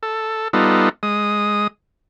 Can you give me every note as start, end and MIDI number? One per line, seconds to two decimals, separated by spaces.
0.03 0.48 69
0.53 0.89 55
0.53 0.89 59
0.53 0.89 63
0.53 0.89 65
0.53 0.89 69
1.03 1.67 56
1.03 1.67 87